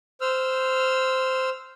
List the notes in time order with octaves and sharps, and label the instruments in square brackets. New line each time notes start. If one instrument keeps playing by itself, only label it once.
[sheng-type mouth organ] C5 E6 F6